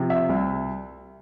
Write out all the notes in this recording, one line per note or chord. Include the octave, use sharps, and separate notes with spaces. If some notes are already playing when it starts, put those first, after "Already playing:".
Already playing: C3 F3
E5
C2